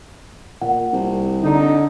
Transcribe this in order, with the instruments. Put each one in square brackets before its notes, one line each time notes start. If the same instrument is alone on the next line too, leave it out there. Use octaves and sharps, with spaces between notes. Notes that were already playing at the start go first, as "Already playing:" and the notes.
[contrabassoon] A#2 [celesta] F#5
[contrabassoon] C2
[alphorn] D3 [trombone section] D#4